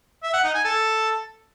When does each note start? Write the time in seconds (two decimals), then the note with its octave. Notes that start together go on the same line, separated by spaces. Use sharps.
0.24 E5
0.34 F#5
0.44 D#4
0.54 G#5
0.64 A4